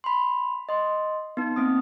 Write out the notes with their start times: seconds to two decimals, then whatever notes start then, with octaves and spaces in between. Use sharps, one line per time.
0.04 B5 C6
0.69 D#5 C6
1.37 B3 D#4
1.56 A#3 C4 D#6